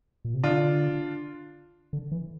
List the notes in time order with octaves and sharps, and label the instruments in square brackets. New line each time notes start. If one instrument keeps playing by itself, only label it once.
[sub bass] A#2
C3
[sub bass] D3 [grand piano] D4 F4
[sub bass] D3
E3